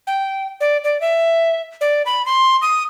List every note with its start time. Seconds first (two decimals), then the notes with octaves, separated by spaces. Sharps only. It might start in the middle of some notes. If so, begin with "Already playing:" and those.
0.07 G5
0.61 D5
0.84 D5
1.01 E5
1.81 D5
2.06 B5
2.26 C6
2.62 D#6